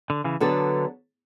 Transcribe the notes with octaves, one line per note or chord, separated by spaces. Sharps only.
D3
C#3 E3
D3 F#3 B3 D4 A4